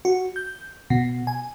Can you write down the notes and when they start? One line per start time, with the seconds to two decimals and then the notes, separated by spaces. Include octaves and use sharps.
0.05 F#4
0.36 G6
0.90 B2
1.27 G#5